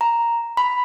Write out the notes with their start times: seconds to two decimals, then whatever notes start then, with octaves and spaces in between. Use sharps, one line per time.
0.01 A#5
0.57 B5